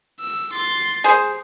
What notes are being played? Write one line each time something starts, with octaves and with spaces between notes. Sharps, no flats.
E6
C6 A6
G#4 C5 C7